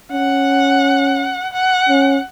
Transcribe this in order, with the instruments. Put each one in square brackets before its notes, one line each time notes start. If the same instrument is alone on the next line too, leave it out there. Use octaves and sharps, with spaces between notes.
[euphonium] C#4 [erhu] F#5
[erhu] F#5
[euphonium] C#4